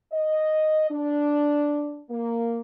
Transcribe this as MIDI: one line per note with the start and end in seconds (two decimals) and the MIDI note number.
0.12 0.86 75
0.90 2.00 62
2.11 2.60 58